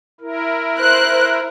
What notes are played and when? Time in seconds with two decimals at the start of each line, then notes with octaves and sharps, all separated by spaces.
0.21 E4 A#4
0.79 C5 F#6